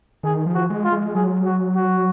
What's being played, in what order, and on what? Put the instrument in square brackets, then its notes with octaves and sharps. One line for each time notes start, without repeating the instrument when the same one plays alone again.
[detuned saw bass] D#3 [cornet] G#4
[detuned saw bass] F3
[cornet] F#4
[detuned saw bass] G#3
[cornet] F4
[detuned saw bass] G#3
[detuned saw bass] F#3 [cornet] G#4
[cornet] F#4
F#4